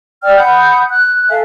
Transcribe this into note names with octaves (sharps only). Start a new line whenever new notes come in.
D5 G5 E6 F6
F#5 B5 D#6 G6
F#6
A4 E5 F5 G#5